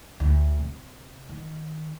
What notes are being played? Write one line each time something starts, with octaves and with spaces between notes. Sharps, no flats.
D2
C3
D#3